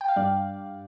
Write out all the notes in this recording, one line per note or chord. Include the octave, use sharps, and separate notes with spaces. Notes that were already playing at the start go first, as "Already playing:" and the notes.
G5
F5
G2 G3 D4 D5